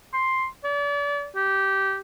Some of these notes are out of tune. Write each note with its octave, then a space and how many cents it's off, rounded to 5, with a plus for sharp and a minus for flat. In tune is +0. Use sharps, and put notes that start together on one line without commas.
C6 +5
D5 -35
G4 -15